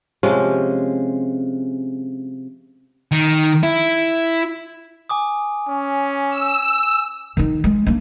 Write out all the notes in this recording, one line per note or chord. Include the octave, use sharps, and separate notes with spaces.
C3 F3 G#3 C#4
D#3
E4
G#5 D6 D#6
C#4
D6 E6
D#3 D#4
G#3
A#3 D4